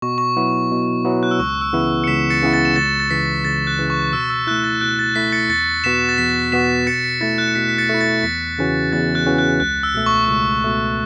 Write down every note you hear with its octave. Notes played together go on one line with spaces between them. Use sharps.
B2 C#6
C#6
F#3 B3 E4
B2
F#3 B3 E4
F#6
E6
C#2 C#6
E6
C#3 E3 B3 E4
C#7
C#2 B6 E7
A6 C#7
C#3 E3 B3 E4
A6 C#7
E7
C#2 A6 C#7
A6
C#3 E3 B6
C#2 A6
F#6
C#3 E3
C#6
B2 E6
E6
A3 E4 F#6
A6
B2 F#6
A6
A3 E4 B6
A6 C#7
E2 A6 C#7
B2 B3 F#4 B6 E7
A6
E2 B6
B2 B3 F#4 B6 E7
B2 A6 C#7
B6
A3 E4 A6
F#6
C#7
B2 B6
B6
A6 C#7
A3 E4
A6
E2 B6
C#3 E3 C#4 F#4
E2 A6
F#6
C#3 E3 C#4 F#4
F#6
C#2 F#6
E6
B2 A3
C#6
C#6
C#2 E6
B2 A3